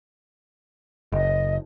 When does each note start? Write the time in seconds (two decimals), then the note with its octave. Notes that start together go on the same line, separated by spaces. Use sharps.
1.12 F#1 D#5